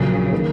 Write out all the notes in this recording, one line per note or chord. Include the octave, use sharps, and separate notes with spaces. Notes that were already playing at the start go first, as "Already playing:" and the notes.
Already playing: A#1 A#2 C#3 F#3
D#3 A#3